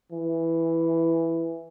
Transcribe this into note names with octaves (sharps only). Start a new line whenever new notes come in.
E3